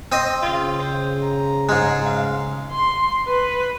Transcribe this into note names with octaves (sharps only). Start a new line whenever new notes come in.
C4 D#5
C#3 F4
C5
A#5
G#2 G#3
F5
C6
B4